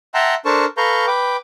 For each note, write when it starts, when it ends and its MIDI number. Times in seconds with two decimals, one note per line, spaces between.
0.14 0.35 76
0.14 0.35 78
0.14 0.35 79
0.14 0.35 81
0.14 0.35 82
0.14 0.35 84
0.45 0.65 62
0.45 0.65 69
0.45 0.65 70
0.45 0.65 72
0.45 0.65 81
0.45 0.65 85
0.77 1.06 69
0.77 1.06 71
0.77 1.06 77
0.77 1.06 82
0.77 1.06 85
0.77 1.06 91
1.07 1.36 71
1.07 1.36 79
1.07 1.36 86